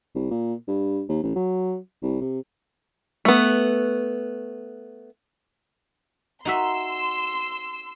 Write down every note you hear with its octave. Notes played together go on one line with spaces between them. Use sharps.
C2
A#2
G2
D#2
A1
F#3
C2
C3
A3 B3
D#4 F#4 E5 C6 E6